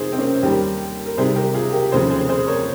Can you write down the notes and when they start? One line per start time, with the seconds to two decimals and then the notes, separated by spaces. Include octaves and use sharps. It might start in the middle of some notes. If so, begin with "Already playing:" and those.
Already playing: F2 C3 D#3 G#4 C5
0.13 C4
0.18 A#3 C#4
0.43 D#2 D#3 G3 G4 A#4
1.06 A#4
1.17 C2 C3 D#3 G3 G#4 C5
1.36 G4 A#4
1.54 F4 G#4
1.73 G4 A#4
1.91 F1 D#2 C#3 F3 G#4 C5
2.10 G#4 C5
2.29 G#4 C5
2.47 A#4 C#5